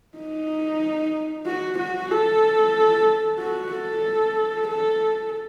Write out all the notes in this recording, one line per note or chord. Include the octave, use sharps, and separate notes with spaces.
D#4
F#4
F#4
A4
F#4
A4
A4